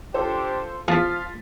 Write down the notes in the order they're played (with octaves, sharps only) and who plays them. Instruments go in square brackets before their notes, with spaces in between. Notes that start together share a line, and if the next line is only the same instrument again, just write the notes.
[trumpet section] D4 G4 [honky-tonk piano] F4 A4 C5
[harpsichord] E2 [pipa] F3 [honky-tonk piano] F4 A6 B6 [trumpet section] F5